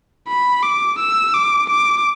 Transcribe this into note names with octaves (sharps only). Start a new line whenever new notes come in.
B5
D6
E6
D6
D6